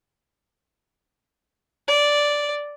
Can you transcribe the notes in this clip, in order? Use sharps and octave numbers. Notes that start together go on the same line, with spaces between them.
D5